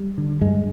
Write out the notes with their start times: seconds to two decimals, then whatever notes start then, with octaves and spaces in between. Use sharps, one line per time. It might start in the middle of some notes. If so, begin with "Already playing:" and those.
Already playing: G3
0.18 D3
0.41 G2 G#3